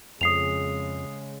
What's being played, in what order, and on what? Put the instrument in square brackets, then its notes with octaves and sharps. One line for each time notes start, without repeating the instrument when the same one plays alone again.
[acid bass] F2 [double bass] C#3 G#3 [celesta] D#6 C7 F7